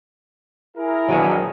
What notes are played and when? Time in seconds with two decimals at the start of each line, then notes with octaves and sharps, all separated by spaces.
0.77 E4 G#4 A#4
1.09 A#1 D#3 F#3 G#3 B3